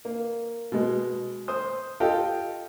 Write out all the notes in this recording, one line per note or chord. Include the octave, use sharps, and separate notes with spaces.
A#3
B2 G#3
C5 D#6
F4 G4 A4 D#5 G5